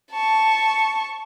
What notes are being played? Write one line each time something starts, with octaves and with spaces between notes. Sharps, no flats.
A5 C#6